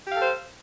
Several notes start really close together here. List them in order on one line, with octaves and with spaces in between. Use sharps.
G4 F5 A4 C5